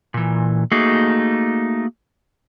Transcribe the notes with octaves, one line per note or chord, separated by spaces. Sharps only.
A#2 E3
A3 A#3 D#4 F#4 G#4